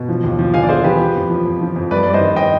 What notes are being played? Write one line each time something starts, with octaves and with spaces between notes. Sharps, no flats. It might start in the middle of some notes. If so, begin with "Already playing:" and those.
Already playing: B2
F3
D#2
F3
D3 F5 G#5
D5
D3 G#4 C5
F3 G4 B4
F3
F2
F3
F2
F3
F2
G2 B4 D5
G2 D5
C5 D#5
D#3
D#5 G5